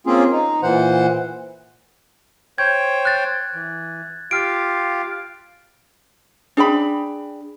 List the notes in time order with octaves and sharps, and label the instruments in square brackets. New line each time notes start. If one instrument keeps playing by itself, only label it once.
[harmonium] A#3 C4 C#4 F4 G#4
D#4
A#2 E3 C5 F#5
[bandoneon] C5 C#5 G5 [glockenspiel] G#6
[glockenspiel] F#6 A6
[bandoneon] E3
[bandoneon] F4 G4 F5 [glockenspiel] F6 D7
[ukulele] D4 G#4 G5 B5